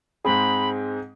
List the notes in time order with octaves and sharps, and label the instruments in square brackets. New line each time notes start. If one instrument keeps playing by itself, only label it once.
[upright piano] G#2 G#3 C4 G#4 [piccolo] B5